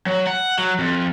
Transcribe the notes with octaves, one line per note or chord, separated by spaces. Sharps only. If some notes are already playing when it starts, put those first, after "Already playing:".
F#3
F#5
F#3
F2